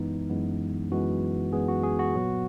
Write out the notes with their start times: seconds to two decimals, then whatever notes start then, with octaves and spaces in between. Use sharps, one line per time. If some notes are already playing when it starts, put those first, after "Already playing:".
Already playing: F#2 E3 G#3 B3 D#4
0.30 F#2 E3 G#3 B3
0.91 F#2 E3 G#3 B3 F#4
1.53 F#2 E3 G#3 B3 G#4
1.68 F#4
1.83 G#4
1.99 F#4
2.14 A#2 F#3 B3